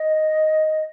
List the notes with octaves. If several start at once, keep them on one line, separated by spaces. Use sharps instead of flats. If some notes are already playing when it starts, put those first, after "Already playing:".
Already playing: D#5